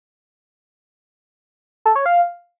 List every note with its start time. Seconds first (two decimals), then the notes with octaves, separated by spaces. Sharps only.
1.85 A4
1.96 C#5
2.06 F5